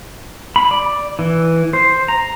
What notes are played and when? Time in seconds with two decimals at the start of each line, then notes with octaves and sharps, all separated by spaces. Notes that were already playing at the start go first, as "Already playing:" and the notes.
0.56 B5
0.71 D5
1.19 E3
1.73 C5
2.08 A#5